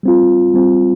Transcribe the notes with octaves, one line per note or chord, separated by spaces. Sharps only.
G3 C4 F4
G3 C4 F4